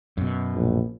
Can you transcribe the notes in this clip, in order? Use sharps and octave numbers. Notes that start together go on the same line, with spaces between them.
F#2 B2
A#1